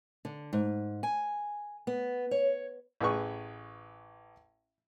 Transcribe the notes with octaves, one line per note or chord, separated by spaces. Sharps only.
D3
G#2
G#5
B3
C#5
A1 G#4 B4 C#6